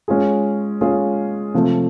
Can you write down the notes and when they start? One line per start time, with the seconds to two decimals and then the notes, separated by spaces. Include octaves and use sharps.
0.08 G#3 C#4 F4 G#4
0.81 G#3 C#4 F4 G#4
1.54 C3 F3 A3